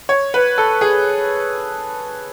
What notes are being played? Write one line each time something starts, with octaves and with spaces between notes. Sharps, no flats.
C#5
B4
A4
G#4